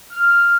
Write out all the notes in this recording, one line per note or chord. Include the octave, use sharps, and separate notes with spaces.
F6